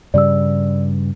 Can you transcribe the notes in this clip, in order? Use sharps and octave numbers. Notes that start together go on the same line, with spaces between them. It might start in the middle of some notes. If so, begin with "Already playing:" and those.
G2 C#3 G3 D5 E6